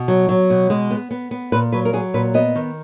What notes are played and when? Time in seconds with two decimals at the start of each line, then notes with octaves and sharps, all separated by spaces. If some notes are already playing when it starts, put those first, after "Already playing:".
Already playing: B2
0.08 F#3
0.29 F#3
0.50 B2
0.70 G#3
0.91 B3
1.11 B3
1.31 B3
1.52 A#2 B4
1.72 F#3 B4
1.85 A#4
1.93 F#3 G#4
2.14 A#2 B4
2.34 B3 D#5
2.55 D#3